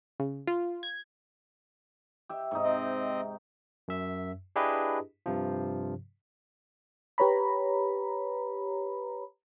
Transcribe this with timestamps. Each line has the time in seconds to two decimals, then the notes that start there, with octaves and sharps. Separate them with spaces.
0.20 C#3
0.47 F4
0.83 G#6
2.29 G4 E5
2.51 G#2 C3 D#4
2.64 C4 D#5
3.88 F#2 E5
4.56 D4 E4 G4 G#4 B4 D#5
5.26 G2 C3 F3
7.18 G4 B4 C#5 A#5 B5